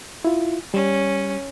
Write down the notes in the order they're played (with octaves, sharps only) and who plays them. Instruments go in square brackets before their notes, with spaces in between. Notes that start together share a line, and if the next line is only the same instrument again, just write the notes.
[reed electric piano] E4 F4
[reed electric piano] G3 [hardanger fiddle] C#4